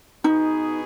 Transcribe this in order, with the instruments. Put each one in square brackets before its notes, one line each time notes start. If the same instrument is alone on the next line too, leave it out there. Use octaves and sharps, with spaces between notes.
[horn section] B2 B3 G#4 [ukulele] D#4